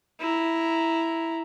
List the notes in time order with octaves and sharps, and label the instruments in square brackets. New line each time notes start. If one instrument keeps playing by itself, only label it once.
[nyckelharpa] E4 A#5